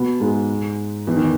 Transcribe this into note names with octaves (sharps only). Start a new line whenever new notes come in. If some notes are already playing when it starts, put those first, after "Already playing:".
Already playing: B2 B3
G#2 G#3
E2 E3
D#3